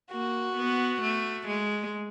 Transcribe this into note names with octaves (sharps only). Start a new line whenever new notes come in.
A#3 F#4
B3
A3
G#3